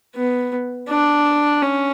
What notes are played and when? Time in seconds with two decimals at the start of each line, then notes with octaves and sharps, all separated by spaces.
0.16 B3
0.89 D4
1.62 C#4